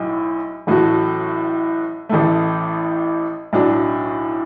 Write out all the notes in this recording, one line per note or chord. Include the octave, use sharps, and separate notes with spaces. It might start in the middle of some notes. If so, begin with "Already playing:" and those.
Already playing: B1 A2
A1 A2 F#3 A3 F#4
A1 A2 A3
B1 A2 F#3 D4 F#4